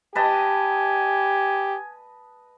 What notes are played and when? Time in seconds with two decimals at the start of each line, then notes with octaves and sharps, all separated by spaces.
0.15 G4 B4 D#5 G#5 A5